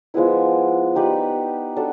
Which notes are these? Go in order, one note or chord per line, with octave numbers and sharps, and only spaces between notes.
F3 G#3 B3 E4
D#4 G4 B4 D5
D4 F#4 A4